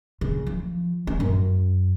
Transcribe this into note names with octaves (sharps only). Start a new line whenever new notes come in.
C#3
F3
C#4
F#2